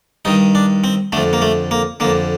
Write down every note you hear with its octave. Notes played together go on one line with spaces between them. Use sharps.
G2 D#3 D#4
D4
C4
F2 D3 A3
A#3
A3
A#3
F2 D3 A#3